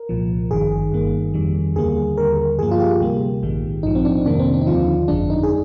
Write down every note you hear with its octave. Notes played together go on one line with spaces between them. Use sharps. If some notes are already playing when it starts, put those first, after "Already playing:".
Already playing: A#4
C2 A#2 F3
G#1 G2 D#3 G#4
G1 G2 D#3 A#3
F2 D#3 G3
D#2 D3 G3 A#3 G#4
D#2 D3 G3 A#4
G2 F3 A#3 G#4
F4
G4
D2 C3 G3 A#3
A#1 G#2 D#3 G#3
A#1 G#2 F3 D#4
C4
D4
F2 C3 D#3 A#3 D4
C4
D4
D#4
D#2 D3 F3 F4
G1 F2 D3 G#3 D4
D#4
G#4